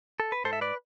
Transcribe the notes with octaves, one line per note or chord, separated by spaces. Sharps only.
A4
B4
G#2 A4 C5
E5
B4 D5